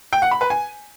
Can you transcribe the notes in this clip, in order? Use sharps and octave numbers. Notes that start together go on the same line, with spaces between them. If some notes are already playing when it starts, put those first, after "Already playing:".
G5
F#5
B5
B4
G#5